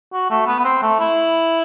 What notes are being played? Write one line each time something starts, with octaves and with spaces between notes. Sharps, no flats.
F#4
A3
B3
B3
C4
A3
E4